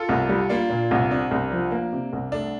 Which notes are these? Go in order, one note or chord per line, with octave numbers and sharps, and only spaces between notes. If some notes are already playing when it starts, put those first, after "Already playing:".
Already playing: F4 A4
C2
G3
A#3 D4 F4
A#2
C2
C3 D4
C2
F3
A#3
C3
C2
A3 D4